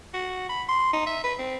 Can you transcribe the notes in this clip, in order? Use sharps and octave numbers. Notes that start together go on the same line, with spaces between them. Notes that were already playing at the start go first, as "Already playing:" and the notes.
F#4
B5
C6
D#4
E5
B4
C4